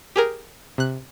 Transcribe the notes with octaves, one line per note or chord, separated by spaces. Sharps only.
G4 G#4 A#4
C3 F#6